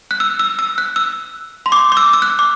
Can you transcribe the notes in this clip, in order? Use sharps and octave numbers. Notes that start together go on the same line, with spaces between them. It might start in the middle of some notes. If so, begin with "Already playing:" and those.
F#6
E6
E6
E6
F#6
E6
C6
D6
D6
E6
E6
F#6
D6